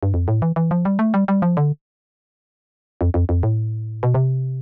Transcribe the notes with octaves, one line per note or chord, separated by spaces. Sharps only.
G2
F2
A2
E3
E3
F3
G3
A3
G3
G3
F3
D3
F2
F2
F2
A2
B2
C3